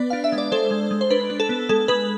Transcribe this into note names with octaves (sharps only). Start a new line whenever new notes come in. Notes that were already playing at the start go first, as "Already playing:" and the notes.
Already playing: B3 B4 D5
D4 F5
E5
G#3
D5
G#3 A4 C5
G#3
G#3
C5
D4 B4
D4
A4
B3
G#3 A4
G#3 B4